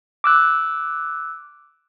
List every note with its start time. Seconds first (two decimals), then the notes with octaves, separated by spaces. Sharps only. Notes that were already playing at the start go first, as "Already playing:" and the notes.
0.24 D6 E6 F#6